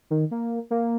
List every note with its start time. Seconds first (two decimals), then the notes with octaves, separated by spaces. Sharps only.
0.10 D#3
0.31 A#3
0.71 A#3